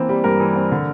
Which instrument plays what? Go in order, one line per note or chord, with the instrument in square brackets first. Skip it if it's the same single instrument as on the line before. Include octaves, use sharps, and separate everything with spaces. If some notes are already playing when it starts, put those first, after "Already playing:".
Already playing: [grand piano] E3 A#3 C4
G3
G2 A#4
E3
C4
D3